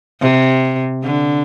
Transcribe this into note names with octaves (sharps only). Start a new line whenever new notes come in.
C3
D3